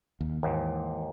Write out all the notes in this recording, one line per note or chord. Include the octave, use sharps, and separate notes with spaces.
D#2
D#2 G#2 E3